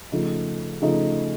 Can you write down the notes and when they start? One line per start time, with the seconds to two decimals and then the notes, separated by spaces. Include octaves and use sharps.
0.12 C#3 F3 A3 D#4
0.82 C#3 F3 A3 D#4